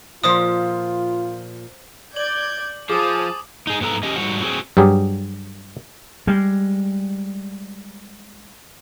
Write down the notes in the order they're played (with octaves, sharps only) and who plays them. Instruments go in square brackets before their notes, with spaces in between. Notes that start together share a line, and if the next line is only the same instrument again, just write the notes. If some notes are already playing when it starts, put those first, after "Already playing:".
[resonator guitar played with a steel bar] A#2 F3 [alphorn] F4 [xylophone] C5 D#6
[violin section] D5 G6 G#6 [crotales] F#7
[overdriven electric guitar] F3 [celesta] G#4 [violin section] C5 G#5 A5 [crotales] D6 D#6
[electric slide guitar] D#4 G#4
G#2 B3 G4 A4 A#5
C#4 G4 D#5
G#2 G3 F#4 C5 F#5
C4 F#4 G#4
[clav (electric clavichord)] G2 F#3 G4 G#4
[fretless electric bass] G3 G#3